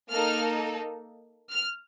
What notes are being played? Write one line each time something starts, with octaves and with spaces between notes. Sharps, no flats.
A#3 D#4 A4 F6
F6